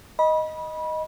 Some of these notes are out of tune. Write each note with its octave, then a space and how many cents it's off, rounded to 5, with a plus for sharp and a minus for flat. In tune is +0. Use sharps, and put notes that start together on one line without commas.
D#5 +5 B5 -25